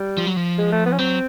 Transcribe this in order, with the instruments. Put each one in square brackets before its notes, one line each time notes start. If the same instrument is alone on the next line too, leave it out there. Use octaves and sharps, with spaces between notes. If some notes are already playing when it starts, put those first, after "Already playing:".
Already playing: [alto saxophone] G3
[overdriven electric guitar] F3
F#3
F3
[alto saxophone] G#3
A3
B3
C#4
[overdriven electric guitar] F#3 [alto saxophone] C4